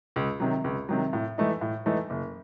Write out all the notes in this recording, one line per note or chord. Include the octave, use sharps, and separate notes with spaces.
C#2
C3 D#3 F#3
C#2
C3 D#3 F#3
A2
E3 A3 D#4
A2
E3 A3 D#4
F#1